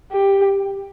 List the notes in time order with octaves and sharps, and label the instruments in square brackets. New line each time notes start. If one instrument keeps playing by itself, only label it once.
[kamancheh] G4